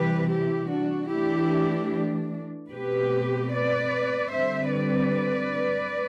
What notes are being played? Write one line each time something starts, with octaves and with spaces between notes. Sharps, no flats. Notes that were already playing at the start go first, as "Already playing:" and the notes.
Already playing: C3 E3 G3 G4 B4
E4 G4
D4 F#4
E3 A3 D4 E4 G4
B2 A3 C4 G4 B4
B4 D5
D3 G3 C4 C5 E5
B4 D5